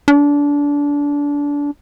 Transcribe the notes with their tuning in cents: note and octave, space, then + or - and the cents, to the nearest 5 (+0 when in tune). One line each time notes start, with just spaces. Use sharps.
D4 -25